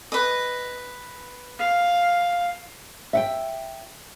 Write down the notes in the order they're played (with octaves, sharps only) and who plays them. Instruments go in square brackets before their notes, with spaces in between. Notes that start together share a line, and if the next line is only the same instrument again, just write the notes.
[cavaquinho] B4 D#5
[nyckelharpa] F5
[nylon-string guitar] E5 F#5 G5